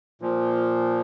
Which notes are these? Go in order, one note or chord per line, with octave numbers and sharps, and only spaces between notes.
A#2 F3